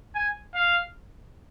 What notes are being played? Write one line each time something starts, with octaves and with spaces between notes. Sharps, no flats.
G#5
F5